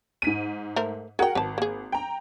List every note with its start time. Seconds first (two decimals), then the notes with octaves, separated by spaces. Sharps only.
0.22 G#2 B6 D#7
0.76 A3 A#4 C5
1.19 F#4 G#4 A#4 F#5 G5
1.35 G#1 B4 A5
1.58 A#3 G#4
1.92 G5 A#5